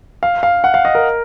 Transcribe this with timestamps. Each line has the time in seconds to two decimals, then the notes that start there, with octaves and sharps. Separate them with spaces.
0.23 F5
0.43 F5
0.64 F#5
0.74 F5
0.85 D#5
0.95 A#4